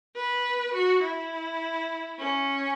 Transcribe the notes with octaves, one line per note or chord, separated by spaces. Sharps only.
B4
F#4
E4
C#4